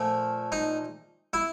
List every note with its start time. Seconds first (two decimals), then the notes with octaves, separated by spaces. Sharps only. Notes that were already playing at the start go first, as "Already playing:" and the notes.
Already playing: A#2 F3 A3
0.52 D#4
1.33 E4